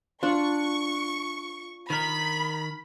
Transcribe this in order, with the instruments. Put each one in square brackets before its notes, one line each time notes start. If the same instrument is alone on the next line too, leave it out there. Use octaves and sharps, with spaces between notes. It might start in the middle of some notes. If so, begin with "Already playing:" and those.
[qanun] D4 [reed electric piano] F4 [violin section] C#6
[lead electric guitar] D#3 A#4 [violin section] B5